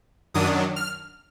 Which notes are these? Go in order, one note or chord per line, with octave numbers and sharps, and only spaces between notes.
F#2 D#3 F#3 D4 D#6
F6